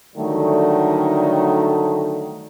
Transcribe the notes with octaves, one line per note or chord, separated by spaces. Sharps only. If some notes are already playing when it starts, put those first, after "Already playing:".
D3 D#3 F#3 G3 A3